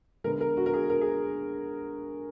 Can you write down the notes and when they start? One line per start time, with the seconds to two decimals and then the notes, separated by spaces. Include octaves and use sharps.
0.24 D3 G#3 B3 A#4
0.41 A#4
0.57 F#4
0.66 A#4
0.73 G#4
0.90 A#4
1.01 G#4